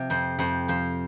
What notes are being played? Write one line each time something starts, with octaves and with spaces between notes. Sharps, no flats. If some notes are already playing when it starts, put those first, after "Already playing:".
Already playing: C3 F3
F2 C5
F2 C5
F3 C5